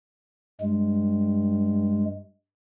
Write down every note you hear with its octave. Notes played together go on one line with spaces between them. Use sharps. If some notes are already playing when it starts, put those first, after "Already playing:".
G2 G#3